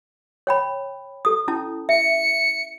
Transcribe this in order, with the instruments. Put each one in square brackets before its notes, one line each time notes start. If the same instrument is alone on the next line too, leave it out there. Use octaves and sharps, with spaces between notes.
[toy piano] C#5 G5 B5
A4 D#6
C#4 E4 A5
[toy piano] E5 [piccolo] C#7